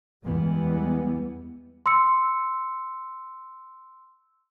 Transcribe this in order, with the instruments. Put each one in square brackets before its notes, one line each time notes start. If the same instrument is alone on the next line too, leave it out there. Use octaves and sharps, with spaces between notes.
[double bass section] E2 E3 G3 G#3 B3
[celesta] C6 E6 C#7